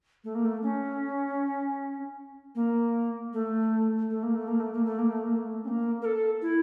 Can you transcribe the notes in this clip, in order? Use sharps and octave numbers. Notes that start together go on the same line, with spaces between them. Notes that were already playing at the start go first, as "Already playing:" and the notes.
A3
A#3
A3
C#4
A#3
A3
A3
A#3
A3
A#3
A3
A#3
A3
A#3
A3
A#3
A3
C#4
A#3
A#4
A4
E4